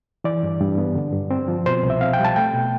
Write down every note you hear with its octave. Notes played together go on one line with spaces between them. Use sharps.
E3 D5
G2
G2
B3
D3
G2
C4
F3
B2 C5
C2
E5
C4 F5
G5
G3
A5
A3 G5
B2